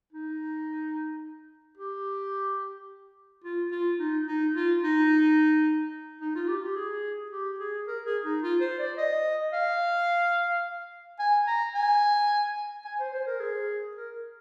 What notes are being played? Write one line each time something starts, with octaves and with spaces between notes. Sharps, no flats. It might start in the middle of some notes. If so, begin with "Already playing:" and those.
D#4
G4
F4
F4
D#4
D#4
F4
D#4
D#4
F4
G4
G4
G#4
G4
G#4
A#4
G#4
D#4
F4
C5
D5
D#5
F5
G#5
A#5
G#5
G#5
C5
C5
A#4
G#4
A#4